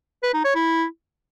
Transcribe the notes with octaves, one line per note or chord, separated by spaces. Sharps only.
B4
D#4
C#5
E4